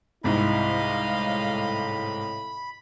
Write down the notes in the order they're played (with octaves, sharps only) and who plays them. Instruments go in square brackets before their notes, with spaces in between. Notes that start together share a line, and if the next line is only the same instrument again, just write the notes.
[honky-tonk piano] C2 G#2 C3 [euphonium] E4 [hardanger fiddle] D#5 F5 [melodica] B5
[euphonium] A2